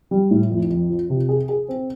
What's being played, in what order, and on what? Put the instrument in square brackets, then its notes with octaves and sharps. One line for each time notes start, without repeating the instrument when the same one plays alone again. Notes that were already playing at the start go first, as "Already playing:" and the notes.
[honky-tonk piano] G3
A2
F2
F2
F3
C3
G#4
G#4
C4